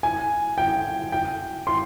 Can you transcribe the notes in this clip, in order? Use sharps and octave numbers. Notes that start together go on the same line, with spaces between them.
G#5
G5
G5
C6